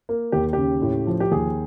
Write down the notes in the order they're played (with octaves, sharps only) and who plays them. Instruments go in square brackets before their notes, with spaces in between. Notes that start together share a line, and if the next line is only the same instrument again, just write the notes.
[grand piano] A#3
D#2 G4
C#3 G4
A2
F3
G4
D#2 G#4